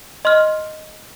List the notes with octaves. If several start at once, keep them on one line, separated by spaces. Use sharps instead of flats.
D#5 C6 F6